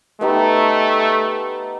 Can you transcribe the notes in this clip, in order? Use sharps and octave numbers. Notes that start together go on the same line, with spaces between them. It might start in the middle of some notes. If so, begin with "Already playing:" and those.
A3 B3 D#4 G4